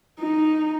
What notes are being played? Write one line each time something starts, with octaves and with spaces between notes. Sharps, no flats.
D#4